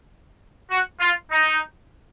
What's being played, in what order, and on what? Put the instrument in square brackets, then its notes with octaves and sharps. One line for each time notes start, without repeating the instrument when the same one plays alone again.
[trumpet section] F#4
F4
D#4